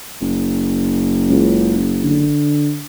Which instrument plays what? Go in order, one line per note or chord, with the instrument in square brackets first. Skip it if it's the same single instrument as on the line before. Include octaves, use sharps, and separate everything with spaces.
[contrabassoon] F#1
[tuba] C#2
D3